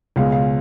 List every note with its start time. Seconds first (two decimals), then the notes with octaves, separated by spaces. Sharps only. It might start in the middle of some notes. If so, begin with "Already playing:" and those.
0.16 C#2 B2 G#3 F5
0.32 F5